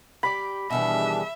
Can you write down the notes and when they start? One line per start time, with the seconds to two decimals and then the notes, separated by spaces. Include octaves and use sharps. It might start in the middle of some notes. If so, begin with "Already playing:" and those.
0.23 G3 G4 D5 B5
0.71 B2 D#3 E3 G3 D4 G#4 E5